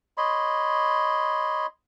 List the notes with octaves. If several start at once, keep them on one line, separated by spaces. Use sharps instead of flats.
C#5 D#5 B5 C6